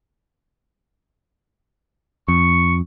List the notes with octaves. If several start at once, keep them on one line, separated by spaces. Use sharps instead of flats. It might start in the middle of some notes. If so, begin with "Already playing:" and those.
F2 C#6